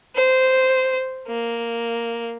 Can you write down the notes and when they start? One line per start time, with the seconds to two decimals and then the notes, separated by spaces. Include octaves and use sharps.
0.16 C5
1.27 A#3